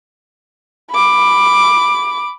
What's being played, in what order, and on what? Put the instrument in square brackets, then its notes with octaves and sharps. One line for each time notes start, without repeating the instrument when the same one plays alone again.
[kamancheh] B5 D6